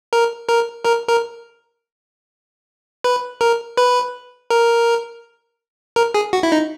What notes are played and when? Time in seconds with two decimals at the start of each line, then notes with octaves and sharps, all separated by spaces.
0.13 A#4
0.48 A#4
0.85 A#4
1.09 A#4
3.04 B4
3.41 A#4
3.77 B4
4.50 A#4
5.96 A#4
6.14 G#4
6.33 F#4
6.43 E4
6.52 D#4